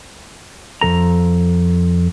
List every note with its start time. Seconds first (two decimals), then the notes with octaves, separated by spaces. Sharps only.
0.81 F2 C#3 A4 A#5